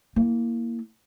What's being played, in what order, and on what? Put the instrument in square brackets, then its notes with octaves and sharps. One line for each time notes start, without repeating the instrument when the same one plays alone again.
[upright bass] A#3 E4